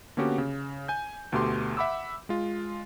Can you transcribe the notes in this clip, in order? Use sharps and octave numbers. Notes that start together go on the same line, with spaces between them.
D3 A#3 B3 C#4 F#4 G4
C#3
G#5 G6
D2 B2 A3 G4 C6 D6
E5 F#5 B5 D6 E6
G#3 F4